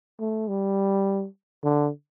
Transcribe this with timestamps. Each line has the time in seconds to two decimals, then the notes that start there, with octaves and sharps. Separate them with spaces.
0.20 A3
0.48 G3
1.64 D3